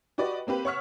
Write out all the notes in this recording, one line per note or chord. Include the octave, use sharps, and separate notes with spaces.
F#4 G4 B4 D5 D#5
A#3 C4 G4 B4
C#5 F#5 C#6 E6 F6 B6